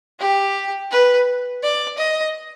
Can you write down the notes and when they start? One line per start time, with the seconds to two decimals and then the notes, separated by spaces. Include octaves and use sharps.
0.20 G4
0.91 B4
1.63 D5
1.98 D#5